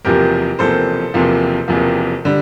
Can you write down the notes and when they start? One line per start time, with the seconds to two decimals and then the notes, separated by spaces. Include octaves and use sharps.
0.05 E1 E2 C3 F3 A#3 G4 A#4
0.59 E1 E2 C3 F3 A#3 A4 C5
1.14 E1 E2 C3 F3 A#3
1.68 E1 E2 C3 F3 A#3
2.25 D3 G3